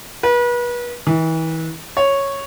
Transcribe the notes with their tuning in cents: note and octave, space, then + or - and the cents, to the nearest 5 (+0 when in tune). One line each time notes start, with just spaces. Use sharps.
B4 -35
E3 -35
C#5 -5